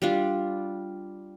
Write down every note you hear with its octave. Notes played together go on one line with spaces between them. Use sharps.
G3 D4 F4